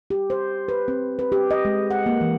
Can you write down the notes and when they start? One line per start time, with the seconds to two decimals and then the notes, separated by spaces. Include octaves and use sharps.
0.10 G4
0.30 C5
0.68 B4
0.88 C4
1.19 B4
1.32 G4
1.51 D#5
1.65 G#3
1.91 F#5
2.06 A#3
2.21 E3